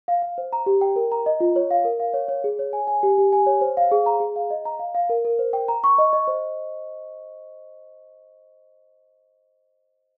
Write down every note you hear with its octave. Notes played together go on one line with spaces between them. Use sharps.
F5
F5
C5
A#5
G4
G5
A#4
A#5
D#5
F4
C#5
F5
A#4
F5
C#5
C#5
G#4
C#5
G#5
G#5
G4
G4
G#5
C#5
C5
F5
G#4
A#5
G#4
F5
D#5
A#5
F5
F5
A#4
A#4
C5
G5
A#5
C#6
D#5
D#5
C5